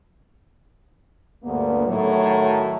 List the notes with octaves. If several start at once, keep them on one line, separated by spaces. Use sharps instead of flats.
D2 G2 A#3 B3
A2 D#3 F#3